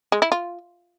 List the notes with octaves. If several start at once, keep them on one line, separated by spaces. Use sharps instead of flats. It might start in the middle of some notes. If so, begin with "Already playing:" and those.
G#3
E4
F4